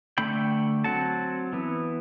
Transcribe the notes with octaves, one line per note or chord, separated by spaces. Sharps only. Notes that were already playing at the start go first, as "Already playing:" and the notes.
D3 A3 C4 G5 B5
F#3 C4 F#5 A5
E3 B3